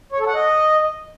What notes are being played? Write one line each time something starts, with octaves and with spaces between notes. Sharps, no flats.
C#5
A4
F#5
D#5